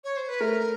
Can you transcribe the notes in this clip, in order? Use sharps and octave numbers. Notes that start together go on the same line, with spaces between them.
C#5
C5
B4
A3 A#4